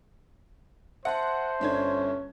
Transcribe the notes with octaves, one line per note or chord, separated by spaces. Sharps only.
C5 E5 F#5 A5 C6
G1 C#4 D4 G#6